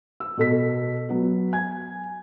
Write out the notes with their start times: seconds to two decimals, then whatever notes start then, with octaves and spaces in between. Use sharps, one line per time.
0.20 E6
0.37 B2 A4 B6
1.09 F#3 B3 F#4
1.53 G#5 G#6